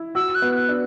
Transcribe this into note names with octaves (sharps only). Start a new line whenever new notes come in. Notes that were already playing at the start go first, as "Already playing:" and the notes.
Already playing: E4
F#4 E6
F#6
B3
F#6
D4